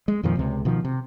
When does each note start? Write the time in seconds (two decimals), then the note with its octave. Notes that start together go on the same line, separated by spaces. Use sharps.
0.08 G#3
0.23 F2 A#2 D#3 F3
0.37 C#2 C3
0.65 B2 D#3 F3
0.84 C3